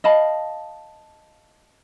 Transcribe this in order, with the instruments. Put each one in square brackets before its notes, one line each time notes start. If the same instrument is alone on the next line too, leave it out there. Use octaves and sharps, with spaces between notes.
[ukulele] D#5 F5 A5 B5